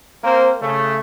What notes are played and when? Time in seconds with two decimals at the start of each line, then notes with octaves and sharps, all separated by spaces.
0.23 A#3 C4 A#4 C5
0.61 C#3 A3